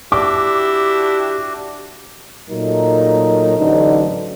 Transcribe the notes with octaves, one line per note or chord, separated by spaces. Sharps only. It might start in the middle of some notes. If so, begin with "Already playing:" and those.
D4 E4 F#4 G4 D6
A#2 F#3 A3 D#4 A#4
A1 D3 F#3 D#4